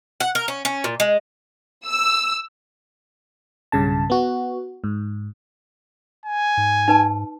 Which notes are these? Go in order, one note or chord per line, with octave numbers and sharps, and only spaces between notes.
F#5
A#4
C#4
C#4
A#2
G#3
E6
B1 G2 C#3 A5
B3 F#4
G#2
G#5
G#2
D#4 B4 A5